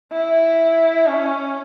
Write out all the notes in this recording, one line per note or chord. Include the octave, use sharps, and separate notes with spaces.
E4
C#4